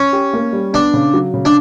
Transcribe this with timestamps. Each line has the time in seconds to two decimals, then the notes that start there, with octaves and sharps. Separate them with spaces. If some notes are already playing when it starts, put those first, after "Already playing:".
Already playing: C#4
0.13 G4
0.33 A#3
0.53 G3
0.73 B3 D4
0.94 C#3
1.14 F#3
1.34 C#3
1.45 D4